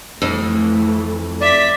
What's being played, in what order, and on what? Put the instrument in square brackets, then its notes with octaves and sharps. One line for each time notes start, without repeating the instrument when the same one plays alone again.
[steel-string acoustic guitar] F2 [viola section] E3 A3
[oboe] D5 [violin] E5 B6